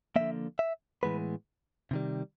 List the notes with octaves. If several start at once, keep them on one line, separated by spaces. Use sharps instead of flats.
D3 F3 A#3 E5
E5
A2 E3 G#3 B3 B4
C3 D#3 G3